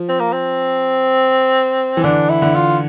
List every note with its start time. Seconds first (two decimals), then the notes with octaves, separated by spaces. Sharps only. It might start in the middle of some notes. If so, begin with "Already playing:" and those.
Already playing: F3
0.09 C4
0.20 A#3
0.32 C4
1.97 E3
2.04 D3 D4
2.30 E4
2.42 D3
2.55 F4